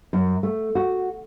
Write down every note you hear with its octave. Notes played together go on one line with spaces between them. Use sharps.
F#2
A3
F#4